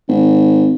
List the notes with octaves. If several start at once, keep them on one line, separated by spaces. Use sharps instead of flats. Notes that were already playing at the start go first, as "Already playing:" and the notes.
G#1